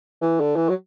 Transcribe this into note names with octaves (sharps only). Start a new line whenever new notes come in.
E3
D3
E3
F#3